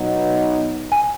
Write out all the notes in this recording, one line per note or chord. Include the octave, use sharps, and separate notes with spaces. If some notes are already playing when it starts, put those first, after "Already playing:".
Already playing: B2 F#3 B3 D#4
G#5